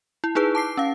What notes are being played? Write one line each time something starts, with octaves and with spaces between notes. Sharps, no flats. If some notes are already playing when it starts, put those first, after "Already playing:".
E4
D#4 E4 G#4 B4
A5 D6 C7
C#4 F5